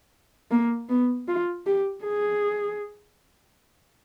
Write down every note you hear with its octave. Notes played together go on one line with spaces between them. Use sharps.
A#3
B3
F4
G4
G#4